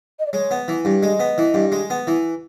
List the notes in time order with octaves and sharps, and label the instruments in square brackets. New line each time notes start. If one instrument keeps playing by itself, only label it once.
[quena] D#5
D5
[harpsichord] G#3 [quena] C#5
[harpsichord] B3
E3
G2
[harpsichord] G#3 [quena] D#5
[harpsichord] B3
E3
G2
G#3
B3
E3